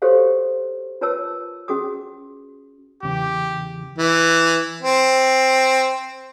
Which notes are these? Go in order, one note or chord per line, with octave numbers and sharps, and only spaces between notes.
F#4 G4 A4 C5 C#5 F5
F4 A#4 B4 C#5 A5 E6
C#4 F#4 G#4 D6 D#6
E2 C#3 E3 G4
E3
C4